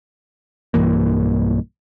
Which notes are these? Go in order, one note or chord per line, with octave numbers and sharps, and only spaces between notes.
B1 G2 E3 A#3